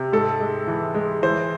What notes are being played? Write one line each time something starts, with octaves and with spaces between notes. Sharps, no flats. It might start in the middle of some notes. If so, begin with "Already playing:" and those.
Already playing: C3
G#2 A4
G#3
E3
G#3
E3 C5